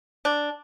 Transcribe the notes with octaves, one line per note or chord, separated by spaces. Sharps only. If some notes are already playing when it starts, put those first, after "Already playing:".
D4